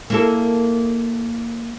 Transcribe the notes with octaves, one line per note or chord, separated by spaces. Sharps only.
A#3 E4 A4